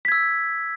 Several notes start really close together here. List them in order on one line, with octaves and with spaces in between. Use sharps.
B6 G#6 E6